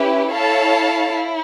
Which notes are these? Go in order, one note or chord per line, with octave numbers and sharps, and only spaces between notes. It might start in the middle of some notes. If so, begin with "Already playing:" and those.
Already playing: C#4 E4 G4 B4
E4 A4 C#5 F5 A5
E4